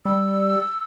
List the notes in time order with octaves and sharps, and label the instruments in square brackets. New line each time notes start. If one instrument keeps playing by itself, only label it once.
[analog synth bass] G3 [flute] E6